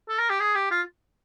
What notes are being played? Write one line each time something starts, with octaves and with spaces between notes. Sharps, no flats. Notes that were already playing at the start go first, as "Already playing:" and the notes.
A4
A#4
G4
G#4
G4
F4